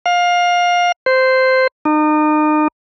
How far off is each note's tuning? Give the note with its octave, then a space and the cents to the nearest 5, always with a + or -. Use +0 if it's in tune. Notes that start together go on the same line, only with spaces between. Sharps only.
F5 +20
C5 -10
D#4 -35